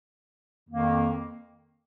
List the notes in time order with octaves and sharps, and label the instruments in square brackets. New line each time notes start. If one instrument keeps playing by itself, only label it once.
[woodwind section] F2 D#3 A#3